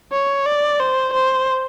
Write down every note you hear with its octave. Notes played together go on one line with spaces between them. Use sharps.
C#5
D5
C5
C5